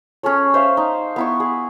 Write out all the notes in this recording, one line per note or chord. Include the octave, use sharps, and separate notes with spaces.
C#4 G#4 A4 C#5
C5 E5 F5
D#4
B3 E4 C#6
G#4